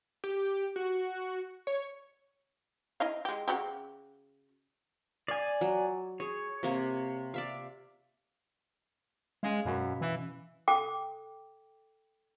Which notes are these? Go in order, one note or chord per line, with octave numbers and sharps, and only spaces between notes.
G4
F#4
C#5
E4 D#5 F5
G#3 G4
C#3 F#4 G4
D5 F5 G#5
F#3
G#4 C#5
C3 A#3
D5 E5 F5
G#3 C#4 F5
F#2 B2 B6
E3
A4 G5 D6